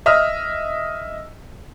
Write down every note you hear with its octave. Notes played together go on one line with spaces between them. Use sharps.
D#5 E5 D#6 F6